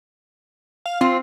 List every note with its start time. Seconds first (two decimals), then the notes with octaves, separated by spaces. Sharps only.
0.86 F5
1.01 C4 F4